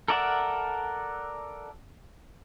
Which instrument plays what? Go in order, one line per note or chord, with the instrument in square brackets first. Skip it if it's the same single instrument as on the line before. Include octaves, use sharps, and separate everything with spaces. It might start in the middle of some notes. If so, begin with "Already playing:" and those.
[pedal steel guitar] A4 A#4 D5 E5 F#5